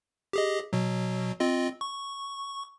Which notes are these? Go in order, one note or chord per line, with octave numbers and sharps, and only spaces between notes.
G4 G#4 D#5
B2 F#3
C4 F4 D#5
C#6